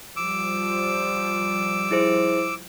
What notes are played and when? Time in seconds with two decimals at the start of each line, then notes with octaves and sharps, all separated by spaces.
0.16 F3 G3 D6 E6
1.91 E4 G#4 C5